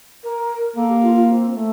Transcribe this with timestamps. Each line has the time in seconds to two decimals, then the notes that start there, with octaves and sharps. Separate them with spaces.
0.24 A#4
0.76 A#3 A4
0.89 G4
1.02 F4
1.16 F4
1.29 C4
1.54 A3